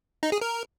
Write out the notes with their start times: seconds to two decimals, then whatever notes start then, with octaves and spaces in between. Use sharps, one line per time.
0.23 D#4
0.32 G#4
0.41 A#4